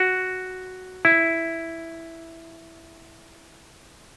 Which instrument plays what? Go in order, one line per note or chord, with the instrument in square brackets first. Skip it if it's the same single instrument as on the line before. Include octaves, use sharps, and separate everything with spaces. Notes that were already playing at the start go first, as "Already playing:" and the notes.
Already playing: [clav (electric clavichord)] F#4
E4